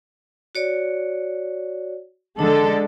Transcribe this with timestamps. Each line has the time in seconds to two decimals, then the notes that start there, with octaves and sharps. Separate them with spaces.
0.55 F#4 C#5 D5
2.39 D3 G#3 D4 A4